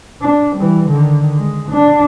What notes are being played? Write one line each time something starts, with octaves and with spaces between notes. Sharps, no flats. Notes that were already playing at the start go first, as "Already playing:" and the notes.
D4
E3 G3
D3 D#3
G#3
D4